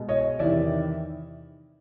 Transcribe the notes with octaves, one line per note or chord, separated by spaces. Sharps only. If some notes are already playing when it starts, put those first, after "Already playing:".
Already playing: B2 G#3
C#5 D#5
E2 C3 D#3 D5 E5